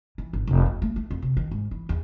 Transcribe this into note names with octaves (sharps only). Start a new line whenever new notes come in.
E3
G#1
F1
E2
A3
A3
F2
C3
D#3
G#2
E3
E2